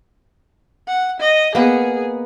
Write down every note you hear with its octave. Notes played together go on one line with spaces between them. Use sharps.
F#5
D#5
A#3 B3 G#4